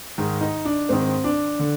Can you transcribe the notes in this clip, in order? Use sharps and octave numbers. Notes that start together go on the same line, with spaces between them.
G#2 D#3
D#4
D4
G#2 D#3 C4
D4
D3